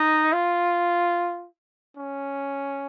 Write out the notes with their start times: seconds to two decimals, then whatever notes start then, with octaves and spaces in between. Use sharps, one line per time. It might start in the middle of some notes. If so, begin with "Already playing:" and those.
Already playing: D#4
0.33 F4
1.97 C#4